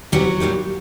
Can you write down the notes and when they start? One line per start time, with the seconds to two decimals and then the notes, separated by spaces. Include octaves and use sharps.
0.12 D2 C3 E3 F#3 G3 F#4
0.40 A#2 G3 A#3 D#4